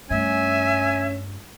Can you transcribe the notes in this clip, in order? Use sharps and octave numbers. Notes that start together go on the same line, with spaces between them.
G2 A3 C#4 E5 G#5